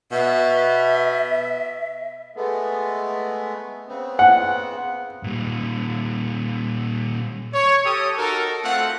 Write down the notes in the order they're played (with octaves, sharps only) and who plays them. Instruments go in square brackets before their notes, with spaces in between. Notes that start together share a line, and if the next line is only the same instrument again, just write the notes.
[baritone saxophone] B2 [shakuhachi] E5
[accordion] G#3 A3 B3
C#3 B3 C4
[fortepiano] F#5
[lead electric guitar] A#2 G3
[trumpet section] C#5
G4 A4 C#5 D#6
D#4 F#4 A4 A#4
A3 C4 F4 A4 F#5